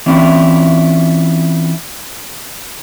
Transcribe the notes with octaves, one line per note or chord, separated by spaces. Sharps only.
E3 C4 C#4 E4 F4